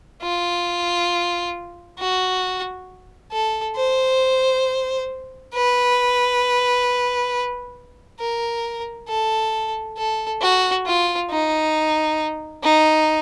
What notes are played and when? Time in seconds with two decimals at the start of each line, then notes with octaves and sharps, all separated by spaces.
0.22 F4
1.99 F#4
3.32 A4
3.76 C5
5.54 B4
8.20 A#4
9.09 A4
9.97 A4
10.41 F#4
10.86 F4
11.30 D#4
12.63 D#4